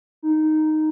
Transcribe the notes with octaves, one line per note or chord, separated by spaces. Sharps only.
D#4